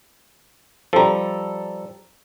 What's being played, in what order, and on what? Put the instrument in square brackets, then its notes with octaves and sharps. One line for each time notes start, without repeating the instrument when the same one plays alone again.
[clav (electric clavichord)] F3 G3 [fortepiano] A4 A#5